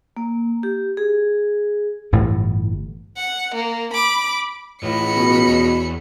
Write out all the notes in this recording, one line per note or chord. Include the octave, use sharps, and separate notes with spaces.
A#3
G4
G#4
G1 A2 E3
F#5
A#3
B5 D6
C#2 A2 E3 D#5 B5 C#7
B2
E2